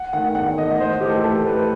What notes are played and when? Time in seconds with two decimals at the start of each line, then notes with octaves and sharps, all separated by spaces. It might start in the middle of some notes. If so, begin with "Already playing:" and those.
Already playing: F#5
0.13 D#3 A3 F#5
0.35 E2 F#5
0.58 D#3 A3 D#5
0.70 D#5
0.80 A2 C5
1.01 E3 A3 G4
1.09 A4
1.24 A2 A4
1.46 E3 A3 B4